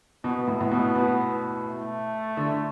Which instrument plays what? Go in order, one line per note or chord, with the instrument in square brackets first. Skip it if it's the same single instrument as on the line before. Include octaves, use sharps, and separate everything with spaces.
[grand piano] B2 [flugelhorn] B3
[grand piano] A2
[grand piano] A2 [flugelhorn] B3
[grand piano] B2
B2
[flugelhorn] A3
[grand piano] D3